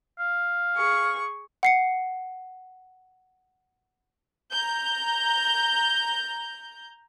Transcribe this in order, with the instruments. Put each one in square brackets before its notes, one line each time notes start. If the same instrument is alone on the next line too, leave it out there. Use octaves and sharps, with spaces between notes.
[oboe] F5
[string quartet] G#4 C#6
[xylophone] F#5 C7 C#7
[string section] A#5 G6